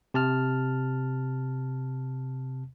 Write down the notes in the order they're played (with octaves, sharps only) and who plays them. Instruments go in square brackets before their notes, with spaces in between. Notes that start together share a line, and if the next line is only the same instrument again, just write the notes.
[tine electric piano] C3 A5 F6